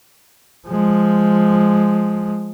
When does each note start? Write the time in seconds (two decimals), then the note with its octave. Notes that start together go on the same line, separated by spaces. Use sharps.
0.68 F3 G#3